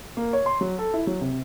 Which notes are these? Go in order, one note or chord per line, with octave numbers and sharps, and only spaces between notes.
A#3
C#5
C6
F#3
A4
E4
F#3
C3